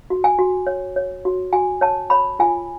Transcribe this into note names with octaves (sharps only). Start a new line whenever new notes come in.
F#4
G#5
F#4
C#5
C#5
F#4
F#4 G#5
C#5 A5
C#5 B5
F4 G#5